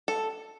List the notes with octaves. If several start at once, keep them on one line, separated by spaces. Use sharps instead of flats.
A4